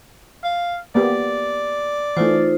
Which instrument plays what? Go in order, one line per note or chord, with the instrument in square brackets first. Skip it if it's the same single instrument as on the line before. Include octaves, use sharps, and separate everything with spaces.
[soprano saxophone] F5
[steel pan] A#3 B3 G4 [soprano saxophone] D5
[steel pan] E3 A3 [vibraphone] D#4 F4 C5